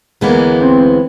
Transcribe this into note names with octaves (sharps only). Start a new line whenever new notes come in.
D2 C#3 E3 G#3 A#3 B3
C4